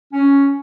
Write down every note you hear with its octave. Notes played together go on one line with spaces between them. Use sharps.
C#4